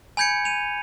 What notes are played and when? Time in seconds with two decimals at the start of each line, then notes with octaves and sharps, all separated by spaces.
0.17 G#5 B5 G6 G#6 C#7
0.45 D#7 F7